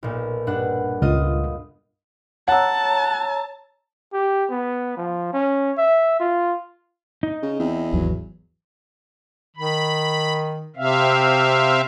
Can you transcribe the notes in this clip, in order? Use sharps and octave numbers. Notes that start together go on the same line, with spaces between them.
B1 A#2
G2 D4 F#5
C#2 F4 D#5 D#6
C#5 F#5 A5 A#5 E6
G4
B3
F3
C#4
E5
F4
D#4
C#3
E2 C4
G#1 D#2 E3 F#3
D#3 B5
C3 C4 E5 F5